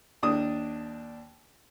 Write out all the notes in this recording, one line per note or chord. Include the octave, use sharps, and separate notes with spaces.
D#2 D4 D#6